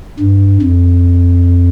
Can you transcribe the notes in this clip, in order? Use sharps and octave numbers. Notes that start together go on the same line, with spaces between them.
G2
F2